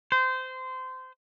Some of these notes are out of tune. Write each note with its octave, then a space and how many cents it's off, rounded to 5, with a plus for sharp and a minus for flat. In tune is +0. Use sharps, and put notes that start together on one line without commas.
C5 -20